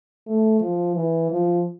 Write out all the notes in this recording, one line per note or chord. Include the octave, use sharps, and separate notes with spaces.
A3
F3
E3
F3